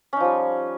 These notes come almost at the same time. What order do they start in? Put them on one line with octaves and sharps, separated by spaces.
C#4 D#4 F3 G3